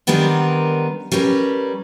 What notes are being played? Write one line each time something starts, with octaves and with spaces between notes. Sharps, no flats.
D#3 G3 B3 C4 D4 A#4
G3 C#4 A#4 B4